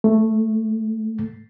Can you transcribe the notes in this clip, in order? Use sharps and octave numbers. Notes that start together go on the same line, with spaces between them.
A3